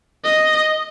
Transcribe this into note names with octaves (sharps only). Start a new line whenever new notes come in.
D#5